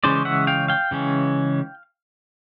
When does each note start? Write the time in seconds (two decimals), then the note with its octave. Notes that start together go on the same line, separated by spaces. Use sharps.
0.04 C#3 E3 G#3 C#4 C5 D5
0.25 E5 F#5
0.47 F5 G5
0.68 F5 G5
0.91 C#3 E3 G#3 C#4